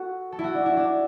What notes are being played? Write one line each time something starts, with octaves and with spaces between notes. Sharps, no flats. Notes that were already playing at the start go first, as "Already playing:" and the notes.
Already playing: F#4 A4
A4
E4
F#4
D4
E4
D4